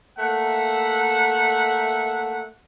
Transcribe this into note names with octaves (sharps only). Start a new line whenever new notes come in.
A3 A#3 E5 F#5